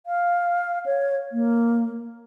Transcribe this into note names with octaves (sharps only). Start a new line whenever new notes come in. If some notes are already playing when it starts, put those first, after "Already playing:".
F5
C#5
A#3